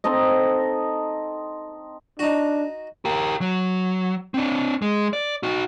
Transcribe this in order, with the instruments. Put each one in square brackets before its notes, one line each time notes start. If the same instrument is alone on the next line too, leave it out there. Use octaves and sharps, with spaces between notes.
[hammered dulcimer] C4 D#4 A4 D#5
[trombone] D4 [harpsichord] D#4 F#4
[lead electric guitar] G4 A#4
F#3
C4 D4
G#3
D5
D#4 F#4